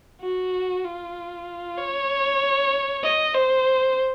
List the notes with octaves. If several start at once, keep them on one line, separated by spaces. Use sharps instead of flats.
F#4
F4
C#5
D#5
C5